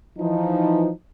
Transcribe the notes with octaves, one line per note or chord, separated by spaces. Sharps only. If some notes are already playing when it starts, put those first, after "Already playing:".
E3 F3 D#4